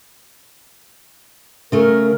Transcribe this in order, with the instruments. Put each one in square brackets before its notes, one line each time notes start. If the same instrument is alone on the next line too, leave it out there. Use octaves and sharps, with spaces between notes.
[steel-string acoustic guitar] C#3 A3 [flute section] A#4